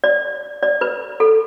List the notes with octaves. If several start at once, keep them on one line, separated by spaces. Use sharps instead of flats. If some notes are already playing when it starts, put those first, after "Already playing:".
D5
D5
B4
A4